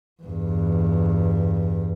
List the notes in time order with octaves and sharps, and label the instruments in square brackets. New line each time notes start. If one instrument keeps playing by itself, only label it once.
[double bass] E2 G2